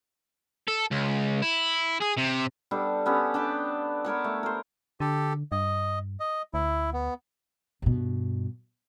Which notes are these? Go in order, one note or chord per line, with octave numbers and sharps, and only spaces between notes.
A4
C#2
E4
G#4
C3
G3 B3 D4 A4
B3 C#4 G4 A4
D4 G5 A5 B5
B3 A#4 C#5 A5
A3
A#4 C5
D3 G4 A4
G2 D#5
D#5
D2 E4
B3
G2 B2